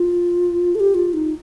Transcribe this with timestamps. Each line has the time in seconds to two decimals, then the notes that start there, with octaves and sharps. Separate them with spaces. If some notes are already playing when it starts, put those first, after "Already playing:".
Already playing: F4
0.75 A4
0.80 G4
0.94 F4
1.13 D#4